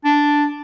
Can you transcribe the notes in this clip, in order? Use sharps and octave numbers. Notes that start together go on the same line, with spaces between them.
D4